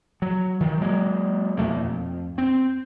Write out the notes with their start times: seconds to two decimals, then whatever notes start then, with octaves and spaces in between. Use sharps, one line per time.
0.22 F#3
0.60 D#3 E3
0.81 F#3 G#3 A#3
1.57 F2 B2 A3 A#3
1.84 F2
2.38 C4